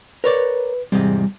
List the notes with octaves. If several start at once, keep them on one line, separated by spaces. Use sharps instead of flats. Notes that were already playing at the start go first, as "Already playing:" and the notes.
A#4 B4 C#5 D5
E2 G#2 C3 G3